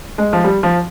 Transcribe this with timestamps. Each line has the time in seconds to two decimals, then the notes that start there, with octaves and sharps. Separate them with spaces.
0.18 G#3
0.33 F3
0.44 G3
0.63 F3